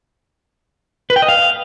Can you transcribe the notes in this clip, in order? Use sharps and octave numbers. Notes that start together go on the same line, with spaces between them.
B4
G5
D#5
F5